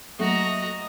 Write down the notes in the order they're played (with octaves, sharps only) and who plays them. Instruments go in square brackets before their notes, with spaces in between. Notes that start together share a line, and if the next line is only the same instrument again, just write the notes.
[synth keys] F#3 A#3 [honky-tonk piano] A3 [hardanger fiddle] F#4 A#5 [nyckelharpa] D#5